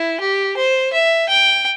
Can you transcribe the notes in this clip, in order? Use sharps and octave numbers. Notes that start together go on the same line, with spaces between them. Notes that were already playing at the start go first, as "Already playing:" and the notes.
Already playing: E4
G4
C5
E5
G5